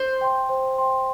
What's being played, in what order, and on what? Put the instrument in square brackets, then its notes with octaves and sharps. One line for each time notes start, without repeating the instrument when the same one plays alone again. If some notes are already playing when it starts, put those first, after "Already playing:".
Already playing: [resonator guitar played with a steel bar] C5
[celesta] G5 C6
C5
G5 C6